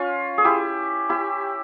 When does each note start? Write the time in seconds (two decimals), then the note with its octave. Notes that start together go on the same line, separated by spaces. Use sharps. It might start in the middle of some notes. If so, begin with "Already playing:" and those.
Already playing: C#4 F4
0.38 G#4
0.45 E4 G4
1.09 E4 G4